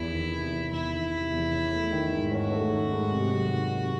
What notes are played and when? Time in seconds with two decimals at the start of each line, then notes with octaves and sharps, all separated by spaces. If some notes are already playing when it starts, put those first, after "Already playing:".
Already playing: E2 E4
0.12 D#3
0.32 C3
0.52 E2
0.72 E2 E4
0.93 D#3
1.12 C3
1.32 E2
1.52 C#4
1.73 A3
1.92 D#3
2.13 G#2
2.31 C#4 F#4
2.52 A3
2.72 D#3
2.92 G#2
3.12 C3
3.32 F#3
3.52 D#3
3.72 C3